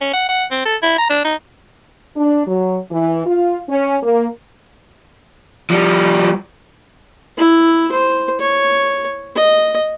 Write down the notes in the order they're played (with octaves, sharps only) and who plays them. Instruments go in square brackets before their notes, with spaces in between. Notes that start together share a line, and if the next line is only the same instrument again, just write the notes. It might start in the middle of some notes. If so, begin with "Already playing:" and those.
[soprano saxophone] C#4
F#5
F#5
C4
A4
E4
A#5
D4
D#4
[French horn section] D4
F#3
E3
F4
C#4
A#3
[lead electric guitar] F3 G3
[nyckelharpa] E4
C5
C#5
D#5